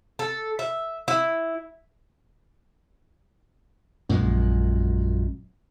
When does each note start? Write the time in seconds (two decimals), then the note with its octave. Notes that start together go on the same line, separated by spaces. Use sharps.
0.19 A4
0.59 E5
1.08 E4
4.10 A#1 F#2 A#2 G#3